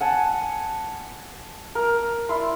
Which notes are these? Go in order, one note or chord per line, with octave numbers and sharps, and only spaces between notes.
F#5 G#5 A5
A#4
E4 D5 C6